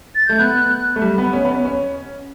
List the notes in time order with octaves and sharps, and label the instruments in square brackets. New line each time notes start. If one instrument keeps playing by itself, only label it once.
[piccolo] A6
[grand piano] A3 [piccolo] G6
[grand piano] B3 [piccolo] F#6
[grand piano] A3
G3
B3
C#4
B3
C#4
C#4